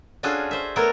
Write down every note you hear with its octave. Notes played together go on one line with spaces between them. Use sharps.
C#4 D4 F4 F#4 G#4 A4
C5 E5
A3 B3 A4 A#4 C#5 D5